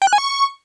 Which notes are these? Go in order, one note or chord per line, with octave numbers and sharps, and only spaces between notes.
G5
F#6
G#5
C#6